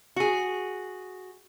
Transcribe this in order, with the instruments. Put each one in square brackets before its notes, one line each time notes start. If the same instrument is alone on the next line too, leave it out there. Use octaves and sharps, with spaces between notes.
[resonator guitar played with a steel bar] F#4 G#4